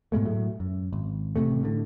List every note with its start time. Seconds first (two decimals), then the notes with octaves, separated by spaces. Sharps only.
0.12 G#2 B2 G#3 A3
0.25 A2 F#3 A3
0.60 F#2
0.93 G#1
1.36 A1 A2 C3 A3
1.63 A2 D3